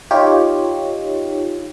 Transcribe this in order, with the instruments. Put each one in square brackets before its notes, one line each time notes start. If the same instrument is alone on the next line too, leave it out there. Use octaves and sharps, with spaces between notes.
[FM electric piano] D#4 F4 G4 C#5